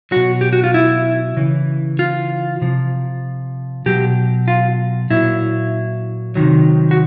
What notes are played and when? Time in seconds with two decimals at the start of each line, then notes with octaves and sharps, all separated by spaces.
0.11 B2 F#3 F#4
0.41 G4
0.53 F#4
0.64 F4
0.74 E4
1.37 C#3 E3
1.99 F4
2.61 C3 F3
3.86 B2 F#3 G4
4.48 F4
5.10 A#2 F#3 E4
6.35 C3 D#3 F#3
6.91 F#4